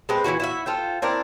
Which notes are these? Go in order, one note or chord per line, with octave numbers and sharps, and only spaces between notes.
G#3 A3 C4 B4
E3 G#3 E4 F#4
E4 F#4 E5
F4 A4 C5 G5
C4 D4 E4 A#4